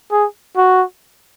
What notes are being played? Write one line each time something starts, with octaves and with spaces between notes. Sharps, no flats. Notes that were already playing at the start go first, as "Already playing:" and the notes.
G#4
F#4